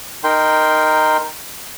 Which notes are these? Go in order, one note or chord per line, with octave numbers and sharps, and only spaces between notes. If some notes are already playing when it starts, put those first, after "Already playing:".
D#4 A#4 G5 C6